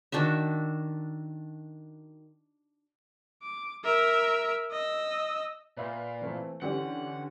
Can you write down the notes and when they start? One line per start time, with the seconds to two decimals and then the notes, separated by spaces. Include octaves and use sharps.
0.12 D#3 D4 F#4 E5
3.43 D6
3.85 A#4 E5
4.72 D#5 E6
5.77 A#2 B4 E5 F5
6.22 E3 A3 C4
6.62 D3 E3 C#4 G4 D5 F#5